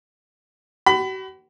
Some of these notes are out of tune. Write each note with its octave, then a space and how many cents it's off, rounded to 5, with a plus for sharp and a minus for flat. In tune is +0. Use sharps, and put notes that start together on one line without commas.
F#4 +45 B5 +20